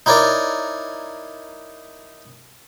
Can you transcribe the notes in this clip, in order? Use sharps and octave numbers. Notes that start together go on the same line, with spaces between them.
D#4 E4 A#4 C#5 D5